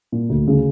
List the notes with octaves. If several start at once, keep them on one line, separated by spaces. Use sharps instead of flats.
A#2
D2
C#3